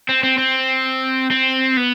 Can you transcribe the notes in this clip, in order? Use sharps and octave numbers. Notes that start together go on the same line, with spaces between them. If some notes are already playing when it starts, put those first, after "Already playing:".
C4
C4
C4
C4
B3